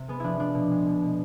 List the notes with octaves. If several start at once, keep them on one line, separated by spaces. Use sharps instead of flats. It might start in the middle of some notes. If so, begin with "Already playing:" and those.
Already playing: C3
G#3 B3
F3 D4 E4
F3 D4
B2
G#3
B2
B2